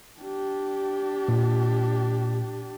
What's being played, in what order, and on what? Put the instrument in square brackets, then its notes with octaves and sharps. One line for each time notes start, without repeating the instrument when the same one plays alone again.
[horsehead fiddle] D4 G4
[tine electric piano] A#2